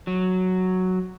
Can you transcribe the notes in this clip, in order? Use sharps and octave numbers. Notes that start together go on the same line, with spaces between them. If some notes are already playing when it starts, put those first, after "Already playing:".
F#3